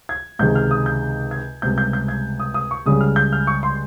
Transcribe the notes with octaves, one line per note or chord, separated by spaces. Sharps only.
G#6
C#2 C3 D#3 G#3 G6
F6
D#6
G6
G#6
C#2 C3 G3 G6
G6
G6
G#6
D#6
D#6
C#6
C#2 C#3 G3 D#6
F6
G6
F6
C#6
C6